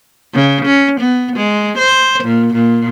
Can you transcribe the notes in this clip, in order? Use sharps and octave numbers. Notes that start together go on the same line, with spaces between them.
C#3
C#4
B3
G#3
C5
A#2
A#2